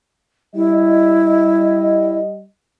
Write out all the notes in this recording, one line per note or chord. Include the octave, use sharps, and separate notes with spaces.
G3 E4 D#5